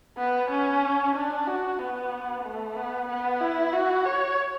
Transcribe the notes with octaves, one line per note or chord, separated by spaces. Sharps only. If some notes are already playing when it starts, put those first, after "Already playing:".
B3
C#4
D4
F#4
B3
A3
B3
B3
E4
F#4
C#5